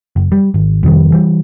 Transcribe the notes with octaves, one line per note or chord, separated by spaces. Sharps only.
F#1
G3
G#1
F2 C3 D#3 G3
E3 G3